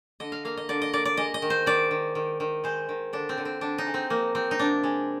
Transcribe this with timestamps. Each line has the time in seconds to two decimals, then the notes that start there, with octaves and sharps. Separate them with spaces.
0.20 D3 D#5
0.32 F5
0.45 A#3 F5
0.57 D#5
0.69 D3 D5
0.82 D#5
0.93 A#3 D5
1.05 D5
1.17 G#3 D#5
1.34 D#5
1.42 D#3
1.50 C5
1.66 D#3 D5
1.91 D#3
2.15 D#3
2.40 D#3
2.64 G#3 C5
2.89 D#3
3.13 D3 D4
3.29 C4
3.38 D3
3.45 C4
3.61 D3 D4
3.78 D#4
3.86 G#3
3.94 C4
4.10 F3 A#3
4.35 F3 C4
4.51 D#4
4.59 C3 D4
4.84 G#3